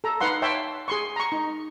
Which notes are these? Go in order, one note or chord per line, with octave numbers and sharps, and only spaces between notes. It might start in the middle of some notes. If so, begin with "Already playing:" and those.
A4 A#5
D#4 B4 F5 F#5 C6
C#5 E5 G5 A5 C6
G#4 C6 C#6
A#5 C#6
D#4